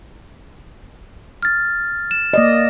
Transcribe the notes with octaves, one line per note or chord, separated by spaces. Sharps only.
F6 A6
E7
A#3 D5 D#5